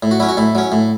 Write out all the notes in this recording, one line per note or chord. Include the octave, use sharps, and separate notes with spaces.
A2
F#4
F#3 C#4 E4
F#4
A2 E4
F#3 C#4
A2